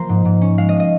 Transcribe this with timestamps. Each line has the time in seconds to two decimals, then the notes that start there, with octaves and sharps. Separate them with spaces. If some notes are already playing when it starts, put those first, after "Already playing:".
Already playing: F3 A#3 A#5 C6
0.09 G#2
0.25 G#2
0.42 C#4
0.58 G#3 F5
0.69 D#5
0.80 D#5